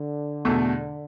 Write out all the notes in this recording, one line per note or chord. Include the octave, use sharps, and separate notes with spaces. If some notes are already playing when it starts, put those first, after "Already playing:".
Already playing: D3
E2 B2 A3